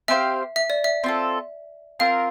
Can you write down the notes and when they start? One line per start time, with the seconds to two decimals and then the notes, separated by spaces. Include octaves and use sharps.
0.08 C4 G4 C5 E5 F5
0.56 E5
0.70 D5
0.84 E5
1.04 C4 F4 A4
2.00 C4 F4 A#4 F5